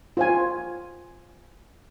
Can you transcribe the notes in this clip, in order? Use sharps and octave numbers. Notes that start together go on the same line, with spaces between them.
F4 C5 G#5